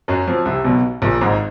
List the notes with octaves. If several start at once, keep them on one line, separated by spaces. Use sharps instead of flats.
F#2 F#3
F2 F3
C2 C3
B1 B2
A#1 A#2
G#1 G#2